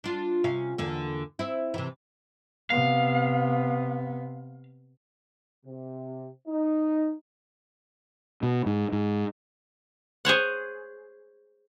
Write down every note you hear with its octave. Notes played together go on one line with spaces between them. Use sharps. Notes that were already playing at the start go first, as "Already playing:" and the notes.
D4 F4
C3 C#4 F5
E2 D3 A#3
C4 E4
C3 E3
C3 B3 F5
C3
D#4
B2
G#2
G#2
G#4 C5 C#5 F#5